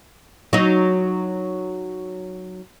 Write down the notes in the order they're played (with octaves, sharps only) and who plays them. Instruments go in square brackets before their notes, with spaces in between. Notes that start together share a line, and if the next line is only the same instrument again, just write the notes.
[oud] F#3 D#4